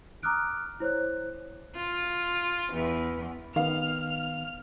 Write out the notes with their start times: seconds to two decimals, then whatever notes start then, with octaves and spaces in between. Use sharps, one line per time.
0.23 A#5 D6 D#6 F6 F#6 D7
0.80 E4 C5 C#5 F#6
1.75 F4
2.73 E2
3.56 D#3 B3 F5 F6